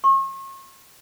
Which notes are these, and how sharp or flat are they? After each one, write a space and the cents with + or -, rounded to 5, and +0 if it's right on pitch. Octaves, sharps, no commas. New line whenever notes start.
C#6 -40